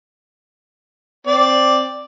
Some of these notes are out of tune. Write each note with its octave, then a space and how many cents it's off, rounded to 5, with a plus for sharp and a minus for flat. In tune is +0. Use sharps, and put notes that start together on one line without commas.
C4 +5 D5 +0